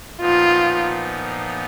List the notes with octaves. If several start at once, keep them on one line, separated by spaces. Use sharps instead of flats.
A#2 F3 B3 D#4 F4